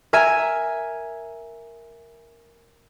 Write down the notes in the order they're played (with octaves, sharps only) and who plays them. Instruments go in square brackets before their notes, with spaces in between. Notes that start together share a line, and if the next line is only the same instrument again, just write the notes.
[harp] A#4 E5 G#5